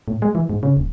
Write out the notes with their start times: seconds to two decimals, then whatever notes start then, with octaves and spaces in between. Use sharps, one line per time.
0.08 A2
0.22 G#3
0.35 E3
0.50 G#2
0.63 C#3
0.77 D#1